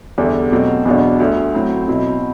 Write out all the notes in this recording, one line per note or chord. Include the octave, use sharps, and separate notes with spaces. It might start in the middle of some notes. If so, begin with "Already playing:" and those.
E2 D3 G3 D4
B2 F#3 A3 C4
E2 B2 F#3 B3 D4
D2 D3 A3
A2 F#3 C4 E4
B2 F#3 C4 E4